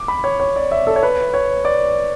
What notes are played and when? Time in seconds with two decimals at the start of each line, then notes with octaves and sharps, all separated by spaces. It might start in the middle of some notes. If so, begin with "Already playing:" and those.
Already playing: D6
0.08 B5
0.24 C#5
0.40 C#5
0.56 D5
0.71 E5
0.87 A4
0.96 C#5
1.03 B4
1.34 C#5
1.65 D5